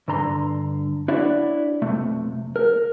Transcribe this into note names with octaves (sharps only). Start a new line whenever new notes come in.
G2 D3 A#5 C6
D4 E4 F#4 C#5 D5
B1 F2 C3 A3
A#4